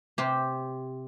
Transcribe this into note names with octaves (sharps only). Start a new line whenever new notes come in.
C3 G4 C5